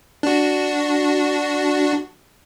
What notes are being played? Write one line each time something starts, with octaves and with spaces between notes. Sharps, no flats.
D4 F#4